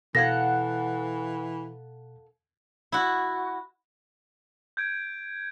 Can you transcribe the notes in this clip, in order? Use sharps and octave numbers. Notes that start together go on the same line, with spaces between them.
B2 E3 A4 F5 F#5 G#6 A#6
E4 F#4
G6 G#6 D7